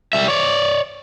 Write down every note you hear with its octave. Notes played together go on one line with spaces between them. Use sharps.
G3 E5
C#5 D5